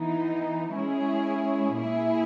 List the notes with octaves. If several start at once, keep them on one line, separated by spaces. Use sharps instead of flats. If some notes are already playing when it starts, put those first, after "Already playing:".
Already playing: E3 B3 D#4
G#3 C#4 E4 G#4
A#2 A#3 E4 G#4